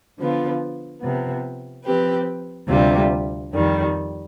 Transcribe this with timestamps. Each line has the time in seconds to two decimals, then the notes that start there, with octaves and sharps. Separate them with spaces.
0.18 D3 F3 B3 F4
1.01 C3 F3 B3
1.84 F3 C4 G4 B4
2.68 D2 C3 G3 C4 F4
3.52 F2 D#3 G3